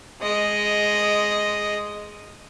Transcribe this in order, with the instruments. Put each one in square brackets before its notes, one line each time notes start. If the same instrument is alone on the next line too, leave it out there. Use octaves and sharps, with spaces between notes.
[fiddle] G#3 D#5